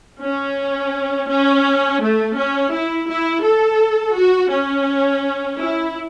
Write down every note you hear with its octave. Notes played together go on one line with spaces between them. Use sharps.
C#4
C#4
A3
C#4
E4
E4
A4
F#4
C#4
E4